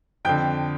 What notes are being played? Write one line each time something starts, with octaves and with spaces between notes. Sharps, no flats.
F2 D3 G5 G6